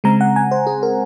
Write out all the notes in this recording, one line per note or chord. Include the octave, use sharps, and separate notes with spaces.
C#3 G#3 C4 A#5
F#5
G#5
C5
G#4
A#4